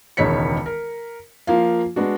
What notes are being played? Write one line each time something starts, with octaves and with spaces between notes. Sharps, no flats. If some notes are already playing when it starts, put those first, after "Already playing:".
E1 C#2 D#3 C#5 B6 C#7
A#4
F3 A#3 F4 F5
G#3 B3 D4 F#4